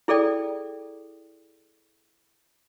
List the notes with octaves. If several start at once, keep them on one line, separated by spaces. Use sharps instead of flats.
E4 G#4 A4 D5 G5